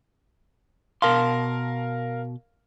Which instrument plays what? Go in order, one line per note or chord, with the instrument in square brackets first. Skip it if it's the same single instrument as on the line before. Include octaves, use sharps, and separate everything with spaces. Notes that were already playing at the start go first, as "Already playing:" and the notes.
[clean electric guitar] B2 A5 C6 [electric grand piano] A#4 F5